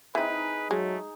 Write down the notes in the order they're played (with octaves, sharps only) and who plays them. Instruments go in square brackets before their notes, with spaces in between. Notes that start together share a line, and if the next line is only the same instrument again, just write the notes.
[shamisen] E3 C4 [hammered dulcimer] D#4 G#4 [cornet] B4
[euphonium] F#3 [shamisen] G#3 [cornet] A3